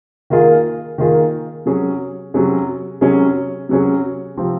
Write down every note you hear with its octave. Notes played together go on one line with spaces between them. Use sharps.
D#3 A#3 F4 G#4
D#3 A#3 F4 G#4
C3 F#3 C#4 G#4
C3 F#3 C#4 G#4
C3 F#3 C#4 G#4
C3 F#3 C#4 G#4
C3 F3 C4